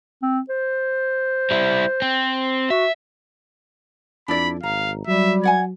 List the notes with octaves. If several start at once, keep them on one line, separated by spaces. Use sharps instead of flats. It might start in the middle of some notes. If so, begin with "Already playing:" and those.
C4
C5
G3 E4
C4
F#4 E5
F2 D4 E4 D5 B5
G#1 F5 A#5
F#3 G3 E5
D5 F#5 G#5 G#6